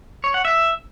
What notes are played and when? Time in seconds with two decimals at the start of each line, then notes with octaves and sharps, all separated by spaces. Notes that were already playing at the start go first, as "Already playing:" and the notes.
0.24 C#5
0.34 F#5
0.45 E5